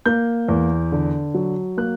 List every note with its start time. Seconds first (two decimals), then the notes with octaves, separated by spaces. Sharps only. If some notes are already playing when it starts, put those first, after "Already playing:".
0.06 A#3 G6
0.48 E2
0.92 D3
1.34 F#3
1.77 A#3 F#6